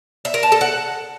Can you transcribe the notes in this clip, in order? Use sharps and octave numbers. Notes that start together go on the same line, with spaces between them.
E5
A#4
A5
A4
F#5